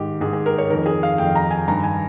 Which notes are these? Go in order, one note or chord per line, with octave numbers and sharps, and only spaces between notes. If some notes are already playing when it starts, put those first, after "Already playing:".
Already playing: G#2 D#3 G4
G#2 D#3 G#4
G#4
A#4
C#5
F2 D#3 A#4
G#4
F5
F2 D#3 G5
A#5
G#5
G2 D#3 A#5
G#5